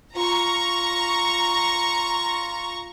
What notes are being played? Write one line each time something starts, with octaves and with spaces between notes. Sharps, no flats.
F4 A#5 C#6